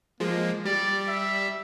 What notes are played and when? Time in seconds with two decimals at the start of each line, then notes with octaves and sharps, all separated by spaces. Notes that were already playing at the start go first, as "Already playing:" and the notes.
0.20 F3 G#3 A#3
0.65 G3 D5
1.08 E5